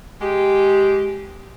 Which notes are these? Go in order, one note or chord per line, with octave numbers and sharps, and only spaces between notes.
G#3 G4